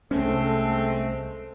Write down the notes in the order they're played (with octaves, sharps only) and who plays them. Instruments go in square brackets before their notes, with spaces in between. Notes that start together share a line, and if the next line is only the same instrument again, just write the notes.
[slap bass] C2 C#4 [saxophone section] G#3 C4 [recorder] A3 [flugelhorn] A4